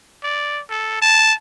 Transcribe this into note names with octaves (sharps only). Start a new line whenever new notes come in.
D5
A4
A5